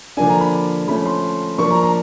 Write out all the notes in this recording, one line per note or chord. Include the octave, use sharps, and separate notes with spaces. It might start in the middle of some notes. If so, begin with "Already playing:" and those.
D3 F3 A#3 D4 G#5
A#5
B5
F3 A3 C#4 B5
C6
F3 A#3 D4 C#6
A#5
A#5